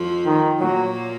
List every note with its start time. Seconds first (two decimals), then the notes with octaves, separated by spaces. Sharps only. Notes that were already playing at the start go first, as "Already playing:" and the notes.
Already playing: F2 F3
0.25 D#3
0.60 A#2 F#3 A#3